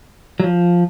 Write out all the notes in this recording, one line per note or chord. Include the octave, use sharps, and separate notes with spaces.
F#3
F3